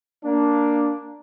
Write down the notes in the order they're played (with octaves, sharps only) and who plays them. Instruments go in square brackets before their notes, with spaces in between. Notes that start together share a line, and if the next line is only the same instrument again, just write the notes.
[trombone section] A#3 D4